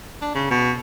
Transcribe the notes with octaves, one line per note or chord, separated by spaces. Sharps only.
D4
C#3
B2